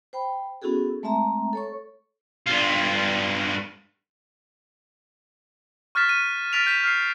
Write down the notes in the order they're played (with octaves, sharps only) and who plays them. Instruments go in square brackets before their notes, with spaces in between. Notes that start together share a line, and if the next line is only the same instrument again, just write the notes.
[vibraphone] C5 G5 B5
B3 C#4 E4 F#4 G#4 A4
G#3 A3 C4 E5 A5 A#5
A4 C#5 C#6
[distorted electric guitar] G2 F4
[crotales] C#6 F6 F#6 A6 B6 E7
D#7
F6 A6 B6 D7 F7
G6 B6 E7
F6 C7